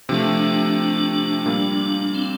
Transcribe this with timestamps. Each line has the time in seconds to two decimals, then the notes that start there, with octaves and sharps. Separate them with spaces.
0.09 C3 F3 A3 D4
1.46 A#2 G3 A#3
2.14 C4